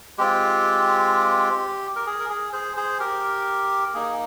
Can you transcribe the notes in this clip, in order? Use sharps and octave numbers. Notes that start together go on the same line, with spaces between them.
G#3 C4 F4 G4
A#4
G#4
A#4
G#4
G#4 C5
G#4 C5
G4 A#4
A#3 D#4 G#4